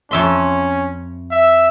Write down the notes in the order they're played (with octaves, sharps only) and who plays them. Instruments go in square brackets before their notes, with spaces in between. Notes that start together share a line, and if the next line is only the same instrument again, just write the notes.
[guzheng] F2 E5 C6 [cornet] C#4
[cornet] E5